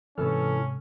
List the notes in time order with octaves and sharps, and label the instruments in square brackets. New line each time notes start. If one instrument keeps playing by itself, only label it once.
[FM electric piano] G#2 C3 F6 [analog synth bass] E3 [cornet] C#4 [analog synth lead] A4